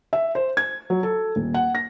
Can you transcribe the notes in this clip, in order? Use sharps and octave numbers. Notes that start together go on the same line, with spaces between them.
E5
C5
G#6
F#3
A4
D#1
F#5
A#6